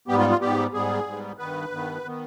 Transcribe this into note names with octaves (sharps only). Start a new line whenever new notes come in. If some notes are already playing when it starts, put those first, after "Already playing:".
G#2 G3 B3 G4
F4
F4
G#2 G3 B3 G4
G#2 G3 B3 G#4
G#2 G3 B3
G2 D#3 B3 B4
G2 D#3 B3
D#3 B3